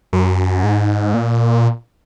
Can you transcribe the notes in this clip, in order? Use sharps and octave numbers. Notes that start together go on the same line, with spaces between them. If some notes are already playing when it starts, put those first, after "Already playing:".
F#2
G#2
A#2